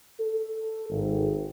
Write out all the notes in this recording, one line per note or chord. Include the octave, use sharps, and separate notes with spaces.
A4
G#1